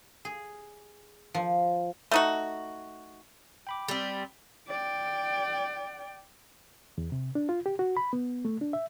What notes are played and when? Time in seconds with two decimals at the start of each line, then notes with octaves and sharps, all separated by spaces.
0.25 G#4
1.34 F3
2.11 A3 D#4 F#4
3.67 G5 B5 D6
3.88 G3 C4
4.68 D5 G5
6.98 E2
7.12 C3
7.35 D4
7.49 F4
7.66 G4
7.79 F#4
7.97 B5
8.13 B3
8.45 A3
8.61 D4
8.73 E5